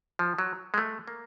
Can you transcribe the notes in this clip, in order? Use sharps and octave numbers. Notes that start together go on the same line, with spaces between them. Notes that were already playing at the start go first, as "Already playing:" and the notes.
F3
F#3
G#3
A3
A#3